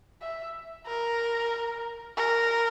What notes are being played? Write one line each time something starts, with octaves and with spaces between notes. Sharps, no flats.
E5
A#4
A#4